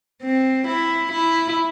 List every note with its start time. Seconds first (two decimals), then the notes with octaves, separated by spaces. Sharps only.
0.23 C4
0.68 E4
1.12 E4